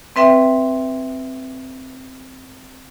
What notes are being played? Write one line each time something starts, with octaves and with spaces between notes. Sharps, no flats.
C4 B4 E5 G5